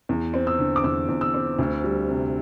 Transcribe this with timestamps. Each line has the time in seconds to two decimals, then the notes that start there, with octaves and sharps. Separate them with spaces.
0.09 E2
0.34 C4
0.47 E6
0.59 D3
0.76 D6
0.84 E2 E6
1.09 E2
1.21 E6
1.34 C4
1.59 D2
1.84 G3
2.08 C3